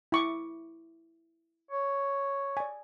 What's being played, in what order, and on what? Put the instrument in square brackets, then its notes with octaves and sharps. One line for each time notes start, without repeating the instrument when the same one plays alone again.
[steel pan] E4 C#6 D6
[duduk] C#5
[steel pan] D5 G#5